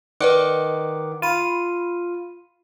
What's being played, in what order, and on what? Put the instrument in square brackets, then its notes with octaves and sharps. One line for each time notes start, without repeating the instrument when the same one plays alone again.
[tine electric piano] D#3 F#5 D6 [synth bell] B4 D5 D#5
[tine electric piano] F4 [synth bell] B5 D#7